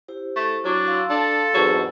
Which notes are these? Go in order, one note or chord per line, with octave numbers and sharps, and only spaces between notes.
E4 G4 C5
A3
F#3 D4 E4
F5 C6 E6
D4 A4
E2 G#2 F#3 C4 G4 A5